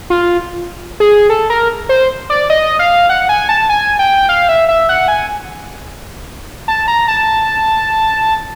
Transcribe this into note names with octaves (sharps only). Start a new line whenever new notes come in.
F4
G#4
A4
A#4
C5
D5
D#5
F5
F#5
G#5
A5
G#5
G5
F5
E5
E5
F#5
G#5
A5
A#5
A5